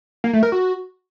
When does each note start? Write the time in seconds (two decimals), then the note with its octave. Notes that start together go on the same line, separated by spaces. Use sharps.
0.24 A#3
0.33 A3
0.43 A#4
0.52 F#4